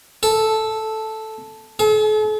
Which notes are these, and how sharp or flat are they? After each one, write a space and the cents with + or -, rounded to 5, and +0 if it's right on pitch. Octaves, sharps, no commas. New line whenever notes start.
A4 -5
A4 -45